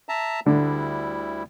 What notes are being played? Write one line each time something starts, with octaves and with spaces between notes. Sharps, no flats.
E5 A5 A#5
D2 D3 G3 E4